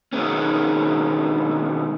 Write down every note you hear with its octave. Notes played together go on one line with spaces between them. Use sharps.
B2 D#3 G3 G#3 B3 C#4